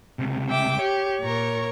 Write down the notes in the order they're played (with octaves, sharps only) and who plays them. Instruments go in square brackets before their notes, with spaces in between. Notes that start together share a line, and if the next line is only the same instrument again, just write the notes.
[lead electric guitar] C#2 C3
[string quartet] E5 G5 D6
[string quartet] G4 [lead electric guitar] C#5
[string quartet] A#2 A#4 C#6